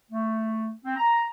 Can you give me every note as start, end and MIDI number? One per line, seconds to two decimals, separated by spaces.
0.11 0.71 57
0.85 0.96 60
0.96 1.25 82